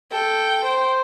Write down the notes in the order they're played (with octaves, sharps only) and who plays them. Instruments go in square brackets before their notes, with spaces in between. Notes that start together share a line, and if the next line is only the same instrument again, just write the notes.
[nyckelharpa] A4 [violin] G5
[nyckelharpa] C5